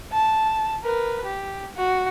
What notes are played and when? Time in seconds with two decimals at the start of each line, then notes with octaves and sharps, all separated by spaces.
0.12 A5
0.83 A#4 B4
1.25 G4
1.76 F#4